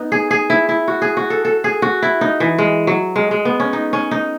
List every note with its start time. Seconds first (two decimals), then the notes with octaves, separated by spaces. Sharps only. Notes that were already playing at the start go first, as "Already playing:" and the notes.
Already playing: B3 D#4
0.12 G#4
0.31 G#4
0.50 E4
0.69 E4
0.88 F#4
1.02 G#4
1.17 F#4
1.30 A4
1.45 A4
1.64 G#4
1.82 F#4
2.02 E4
2.21 D#4
2.40 E3
2.58 G#3
2.87 F#3
3.16 G#3
3.31 G#3
3.45 B3
3.60 C#4
3.73 D#4
3.93 C#4
4.11 D#4